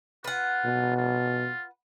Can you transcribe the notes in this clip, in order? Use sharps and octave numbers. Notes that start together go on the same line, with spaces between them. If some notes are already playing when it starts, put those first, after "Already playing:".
F4 B4 F#5
B2
F4